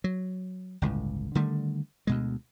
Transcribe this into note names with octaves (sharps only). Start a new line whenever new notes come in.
F#3
G1 C#2 A2
D3 D#3 G3 A3
D2 B2 G#3